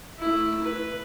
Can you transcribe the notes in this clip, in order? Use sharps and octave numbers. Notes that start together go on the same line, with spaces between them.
A3 E4
B4